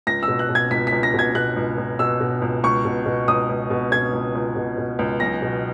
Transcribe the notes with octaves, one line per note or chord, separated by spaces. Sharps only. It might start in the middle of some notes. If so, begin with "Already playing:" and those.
C#2 A#6
E6
B2
F#6
B2
G#6
C#2 B6
B6
C#2
A#6
B2 G#6
B2 F#6
C#2
C#2
B2 E6
B2
C#2
C#2 C#6
B2
B2
C#2 D#6
C#2
B2
B2 G#6
C#2
C#2
B2
B2
C#2
B1 A#6
B2